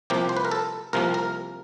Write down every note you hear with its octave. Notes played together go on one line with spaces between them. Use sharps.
C2 C3 F3 A#3 G4
C5
B4
A#4
A4
C2 C3 F3 A#3 A#4
A#4